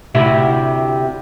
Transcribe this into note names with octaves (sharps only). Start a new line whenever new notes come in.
D2 C3 E4